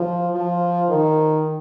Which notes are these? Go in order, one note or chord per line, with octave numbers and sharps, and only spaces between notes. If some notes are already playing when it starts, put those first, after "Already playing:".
Already playing: F3
F3
D#3